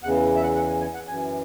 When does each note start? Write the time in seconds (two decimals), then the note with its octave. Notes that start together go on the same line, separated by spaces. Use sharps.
0.03 E2 C#3 E3 F#5
0.36 E5
0.43 F#5
0.55 F#5
0.69 G#5
0.81 G#5
0.94 F#5
1.08 F#2 E3 G#5